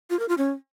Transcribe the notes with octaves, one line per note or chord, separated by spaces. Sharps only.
F4
A#4
F4
C#4